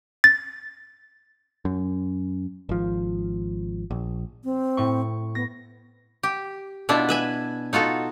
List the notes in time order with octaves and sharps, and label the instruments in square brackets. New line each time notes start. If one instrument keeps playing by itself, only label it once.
[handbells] A6
[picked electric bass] F#2
G#1 F3
A#1
[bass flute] C4
[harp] A2 C#6
[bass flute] B3 [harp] A#6
[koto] G4
B2 D4 E4 F4 E5
B4 E5 G#5
D#4 F4 F#4 A4